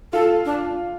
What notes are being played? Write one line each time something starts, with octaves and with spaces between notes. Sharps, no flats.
F4 A4
D4